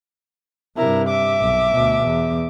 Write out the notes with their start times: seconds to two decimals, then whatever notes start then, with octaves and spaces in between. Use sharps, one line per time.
0.77 G2 C3 E4 A#4
1.08 E5 D6
1.40 B1
1.73 D2 B2
2.05 E2